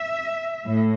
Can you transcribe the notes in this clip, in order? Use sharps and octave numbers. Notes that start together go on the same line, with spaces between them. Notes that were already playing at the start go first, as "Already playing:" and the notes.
Already playing: E5
A2